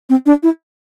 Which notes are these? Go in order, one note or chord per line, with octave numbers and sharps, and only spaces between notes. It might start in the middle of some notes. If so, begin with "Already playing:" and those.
C4
D4
E4